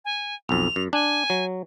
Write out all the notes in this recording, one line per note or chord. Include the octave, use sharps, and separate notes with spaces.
G#5
B1 F2 F7
F#2
D4 G#5
F#3